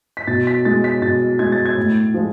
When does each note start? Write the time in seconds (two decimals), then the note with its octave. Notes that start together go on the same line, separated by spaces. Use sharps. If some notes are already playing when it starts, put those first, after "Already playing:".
0.17 B6
0.27 B2 A6
0.47 B6
0.65 G#3 A6
0.84 B6
1.02 B2 A6
1.39 G#3 G#6
1.52 A6
1.65 G#6
1.77 A2
2.14 F3 G#3